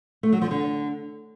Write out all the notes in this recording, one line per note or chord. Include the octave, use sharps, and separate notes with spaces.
A3
F#3
F3
D3